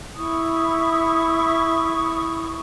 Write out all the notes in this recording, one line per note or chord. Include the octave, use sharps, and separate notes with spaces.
E4 C#6 D#6